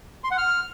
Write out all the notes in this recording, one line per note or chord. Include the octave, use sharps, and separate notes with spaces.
C6
F#5
F6